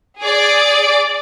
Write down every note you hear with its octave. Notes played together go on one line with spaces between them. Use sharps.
G#4 D5 D6